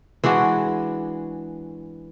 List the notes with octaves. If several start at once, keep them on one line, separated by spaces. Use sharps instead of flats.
E3 G#3 D4 F#4